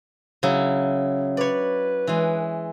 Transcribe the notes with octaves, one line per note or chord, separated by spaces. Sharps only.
C#3 F#3 E4
B4 C#5 D5
E3 G#3